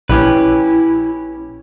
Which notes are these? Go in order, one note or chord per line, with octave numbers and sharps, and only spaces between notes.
A#1 C#4 E4 G4 B4